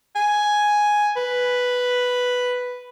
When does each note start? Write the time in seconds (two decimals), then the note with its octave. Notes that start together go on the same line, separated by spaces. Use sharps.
0.16 G#5
1.16 B4